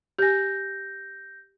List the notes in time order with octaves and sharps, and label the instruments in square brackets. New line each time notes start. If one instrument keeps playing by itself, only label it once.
[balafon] G4 G#5 [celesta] G6 A#6